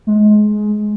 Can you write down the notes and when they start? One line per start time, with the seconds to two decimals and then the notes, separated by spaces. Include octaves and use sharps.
0.07 G#3